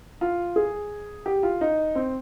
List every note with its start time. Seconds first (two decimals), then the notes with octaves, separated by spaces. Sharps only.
0.21 F4
0.56 G#4
1.26 G4
1.43 F4
1.61 D#4
1.95 C4